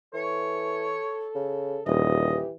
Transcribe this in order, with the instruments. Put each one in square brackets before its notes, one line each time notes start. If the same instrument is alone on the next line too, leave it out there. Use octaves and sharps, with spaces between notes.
[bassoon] E3 [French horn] A4 [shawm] C#5
[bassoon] C#3
[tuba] D#1 [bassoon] E3 [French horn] G4 [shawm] D#5